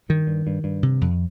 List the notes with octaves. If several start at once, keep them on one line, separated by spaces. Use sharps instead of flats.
G2 D#3
G2
G2
G2
C3
F2